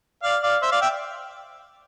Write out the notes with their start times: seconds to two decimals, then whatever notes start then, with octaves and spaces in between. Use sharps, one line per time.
0.23 D5 F5
0.42 D5 F5
0.62 C5 E5
0.72 D5 F5
0.81 E5 G5